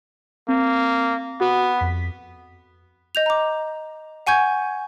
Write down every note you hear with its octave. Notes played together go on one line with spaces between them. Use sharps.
A#3 C4
B3 F#4
F2 B6
D#5 G6 F7
A#5 D6
F#5 G#5 C#6 G6 G#6